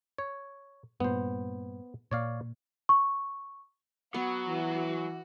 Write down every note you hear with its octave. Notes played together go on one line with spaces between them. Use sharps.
C#5
G2 A#2 B3 C5
A#2 A#3 C#5 D5 F5
C#6
F#3 B3 F#4
E3